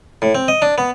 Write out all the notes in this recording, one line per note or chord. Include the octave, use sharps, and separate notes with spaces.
A2
C4
D#5
D4
B3